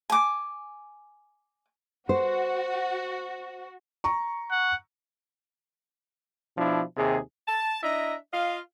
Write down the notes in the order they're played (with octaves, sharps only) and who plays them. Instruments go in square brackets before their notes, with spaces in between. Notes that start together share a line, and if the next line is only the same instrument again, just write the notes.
[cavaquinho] G#5 D6
[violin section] F#4 [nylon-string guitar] C5
[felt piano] A#5 C#6
[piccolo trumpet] F#5
[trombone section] B2 F3 D4 E4
D#2 C3 G#4
[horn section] A5
D4 E4 D#5 E5 A#5
F4 D#5 F5